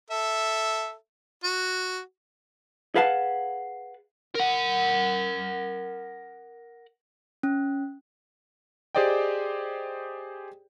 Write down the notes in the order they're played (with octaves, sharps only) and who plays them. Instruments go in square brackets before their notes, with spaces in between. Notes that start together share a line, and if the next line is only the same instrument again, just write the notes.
[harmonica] A4 E5
F#4
[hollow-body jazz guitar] G#4 B4 F5 F#5 A5
[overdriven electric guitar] A#4 F#5
[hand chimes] C#4
[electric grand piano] G4 G#4 C5 D5 D#5 G5